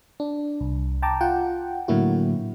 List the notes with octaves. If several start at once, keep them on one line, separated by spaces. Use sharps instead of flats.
D4
C2
G5 A5 A#5 D6
F4 F#5 G5
A2 D3 F#3 A#3 E4 F#4